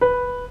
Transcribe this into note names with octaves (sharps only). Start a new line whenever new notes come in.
B4